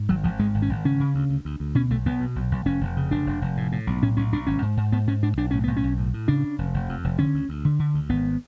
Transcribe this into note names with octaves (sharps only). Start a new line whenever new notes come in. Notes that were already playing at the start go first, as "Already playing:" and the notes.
Already playing: G#2
G#1 F#3
G#1 F3
G#2 G#3
G#1
C#4
G#1
C#3 C#4
C#3
D2
D2
D2
D2
B2 C#4
B1 A3
B1 B3
B2
B1
B1
F1 C#4
F1
C#3
F1 D4
F1
F1
A2
A2
B1
A2 C#4
B1 C#4
B1 D4
G#1 C#4
G#2
G#2
G#2 B3
G#2 C#4
G#2 D4
B1 D4
A2 C#4
B1 B3
C#4
B1
A2
A2
C#3 D4
C#3
F1
F1
F2
F1
D3 C#4
D2
D2
D3
D3
D2
G#1 B3